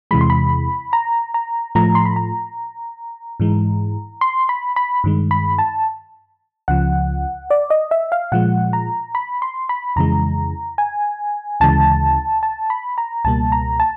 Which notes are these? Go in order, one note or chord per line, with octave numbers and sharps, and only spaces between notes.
E2 C3 E3 G#3 B5
C6
B5
A#5
A#5
A2 F3 A3 A#5
C6
B5
A#5
G#2 E3 G#3
C6
B5
B5
G2 D#3 G#3
B5
A5
C#2 C#3 F3 F#5
D5
D#5
E5
F5
A#2 F3 G#3 F#5
A#5
B5
C6
B5
F2 C#3 E3 G#3 A#5
G#5
D2 C#3 E3 G#3 A5
A5
B5
A#5
C#2 B2 G3 A#3 A5
A#5
A5